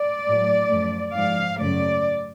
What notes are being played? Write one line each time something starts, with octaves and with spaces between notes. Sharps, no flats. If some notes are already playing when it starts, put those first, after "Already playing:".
Already playing: D5
A2 F#3 A3
F#2 F3 A3
G#2 F3 G#3 F5
F#2 C#3 F#3 A3 D5